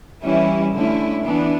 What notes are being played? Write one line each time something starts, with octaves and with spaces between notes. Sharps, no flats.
E3 G3 C#4 E4
D3 A3 C#4 E4
E3 B3 D4